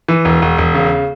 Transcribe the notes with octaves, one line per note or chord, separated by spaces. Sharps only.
E3
E1
E1
E1
C#3